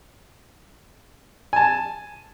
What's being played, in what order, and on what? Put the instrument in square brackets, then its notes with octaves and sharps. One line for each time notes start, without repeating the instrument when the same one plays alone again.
[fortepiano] G#5 A5